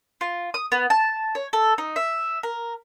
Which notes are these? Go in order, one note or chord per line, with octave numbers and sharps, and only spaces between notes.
F4
D#6
B3
A5
C#5
A4
D#4
E5
A#4